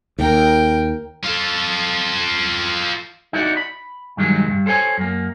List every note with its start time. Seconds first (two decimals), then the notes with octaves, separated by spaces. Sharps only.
0.19 D#2 A#4 G5
1.24 F4 A4
3.33 D#4 E4 F#4 D5 F#5
3.57 B5
4.17 G2 D#3 F#3 G#3
4.46 D2 G2
4.66 A4 C5 C#5 F#5 G#5
4.98 F#2 A#3